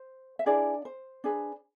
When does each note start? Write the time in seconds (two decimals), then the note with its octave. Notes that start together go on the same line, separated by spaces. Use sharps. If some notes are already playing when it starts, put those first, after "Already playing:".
Already playing: C5
0.39 E5
0.46 D4 E4 G#4 B4 D5
0.85 C5
1.24 D4 G#4 B4